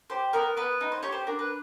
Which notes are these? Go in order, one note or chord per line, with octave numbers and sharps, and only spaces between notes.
G4 C5
B3 A#4
B3 B4
D#4
C5
G4 C#5
C5
D4 A#4
B4